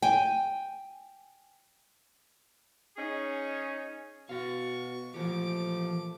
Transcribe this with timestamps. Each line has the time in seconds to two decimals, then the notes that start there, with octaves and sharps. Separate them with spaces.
0.02 G5 G#5
2.97 C#4 D#4 G#4 C#5
4.29 B2 F#4 F5 C#6
5.14 A#2 E3 F3 A3 G4 D6